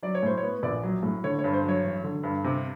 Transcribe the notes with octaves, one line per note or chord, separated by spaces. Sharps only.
F#3 D5
C#5
A2 C5
C#5
B3
A#1 D5
F#3
A2
D3 C#5
C#5
G2
C5
F#3 C#5
A1
D3
G2
C3